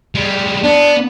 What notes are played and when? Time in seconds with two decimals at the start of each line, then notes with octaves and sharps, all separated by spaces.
0.15 G3 G#3
0.63 B3 D4